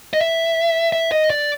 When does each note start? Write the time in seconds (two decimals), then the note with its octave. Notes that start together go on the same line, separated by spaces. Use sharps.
0.13 D#5
0.21 E5
0.92 E5
1.12 D#5
1.30 D5